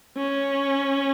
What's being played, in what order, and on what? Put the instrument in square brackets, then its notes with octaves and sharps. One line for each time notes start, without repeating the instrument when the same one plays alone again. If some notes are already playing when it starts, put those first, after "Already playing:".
[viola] C#4